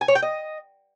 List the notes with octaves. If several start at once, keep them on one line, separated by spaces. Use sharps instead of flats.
G#5
C#5
G5
D#5